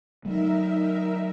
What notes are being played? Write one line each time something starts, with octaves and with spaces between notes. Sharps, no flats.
F#3 A3 D#4 A#4 E5